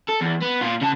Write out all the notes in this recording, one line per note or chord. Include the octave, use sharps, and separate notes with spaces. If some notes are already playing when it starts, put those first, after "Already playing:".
A4
E2
B3
A#2 F4
C#3 A5